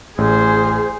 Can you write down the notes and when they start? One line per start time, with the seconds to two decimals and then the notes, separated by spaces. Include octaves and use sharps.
0.18 A1 G#4 C5